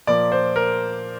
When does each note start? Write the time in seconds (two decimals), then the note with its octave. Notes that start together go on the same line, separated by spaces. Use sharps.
0.07 A#2 F3 A#3 D5
0.32 C5
0.56 A#4